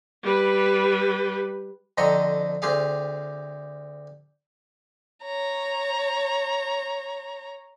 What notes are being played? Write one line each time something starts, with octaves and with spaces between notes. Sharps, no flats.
G3 B4
F2 D3 C4 D#5 A#5 C#6
D2 C4 G4 G#4 F5
C#5 A#5